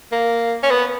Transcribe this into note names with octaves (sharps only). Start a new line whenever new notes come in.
A#3
C#4
B3